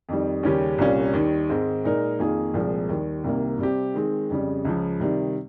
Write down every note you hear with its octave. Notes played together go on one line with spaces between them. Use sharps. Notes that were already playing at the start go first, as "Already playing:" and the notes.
F2 D#3 G3
D#2 C#3 G3 C#4 G4
C2 A#2 G3 C#4 F4
D#2 D#3 G3
G#2 D#3 G#3 C4
A#2 G#3 D#4 A#4
F2 D#3 A#3 F4 G#4
C2 A#2 F3 G#3
D#2 D#3 G3
C2 C3 D#3 A#3
C3 G3 C4 G4
D#3 G#3 C4
F2 C#3 G3
C#2 C#3 F3
C3 D#3 G3